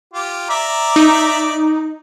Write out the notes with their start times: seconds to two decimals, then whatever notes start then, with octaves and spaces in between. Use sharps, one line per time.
0.13 F4 G4
0.50 D5 E5 A#5
0.96 D#4